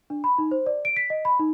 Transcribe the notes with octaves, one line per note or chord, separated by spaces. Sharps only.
D4
B5
D#4
C5
D5
D7
B6
D#5
B5
D#4